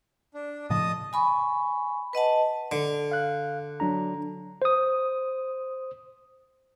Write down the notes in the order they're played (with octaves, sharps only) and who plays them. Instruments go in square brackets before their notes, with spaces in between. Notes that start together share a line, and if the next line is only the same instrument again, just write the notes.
[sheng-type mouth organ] D4
[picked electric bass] A2 C#3 F3 [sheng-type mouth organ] D#5 A5 D#6
[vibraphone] G#5 B5 C#6
B4 D#5 F#5 A5
[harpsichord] D3
[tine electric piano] F5 F#6
F#3 D4 A#5
C5 D#6